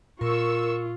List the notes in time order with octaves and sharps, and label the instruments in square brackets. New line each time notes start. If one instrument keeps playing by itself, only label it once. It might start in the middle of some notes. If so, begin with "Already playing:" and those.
[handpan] A#2 [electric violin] F4 [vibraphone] A#4 [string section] C#6 E6